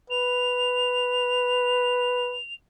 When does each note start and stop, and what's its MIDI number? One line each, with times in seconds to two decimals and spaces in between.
0.10 2.37 71
0.10 2.53 101